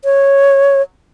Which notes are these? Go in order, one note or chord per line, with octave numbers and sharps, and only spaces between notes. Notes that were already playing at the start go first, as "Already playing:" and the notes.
C#5